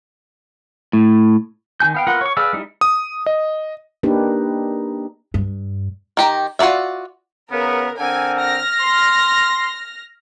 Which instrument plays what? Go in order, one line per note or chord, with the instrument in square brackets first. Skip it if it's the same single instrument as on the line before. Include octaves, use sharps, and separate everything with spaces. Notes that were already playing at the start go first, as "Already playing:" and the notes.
[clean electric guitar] A2
[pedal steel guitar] D#3 F4 G#5 G6
B3 F5 G5
B3 F4 A#4 F#5
C#5 C#6
G#4 B4 D5 F5 E6
G3 D#4 E4
[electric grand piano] D#6
D#5
[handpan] A#3 D4 D#4 G4 B4
[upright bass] G2
[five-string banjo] D#3 G4 A#5
F4 F#4 A#4 D5 E5
[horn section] C#3 B3 [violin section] A#4
[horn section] D3 C4 A#4 [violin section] G#5
[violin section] F6 A#6
[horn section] C6